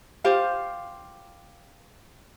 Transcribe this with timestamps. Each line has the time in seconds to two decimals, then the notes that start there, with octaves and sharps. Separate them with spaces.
0.24 F4 G4 C5 F5